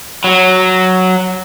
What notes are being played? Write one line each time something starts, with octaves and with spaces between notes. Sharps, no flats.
F#3